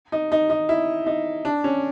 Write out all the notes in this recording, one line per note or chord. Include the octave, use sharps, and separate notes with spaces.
D#4
D#4
D#4
E4
D#4
D4
C#4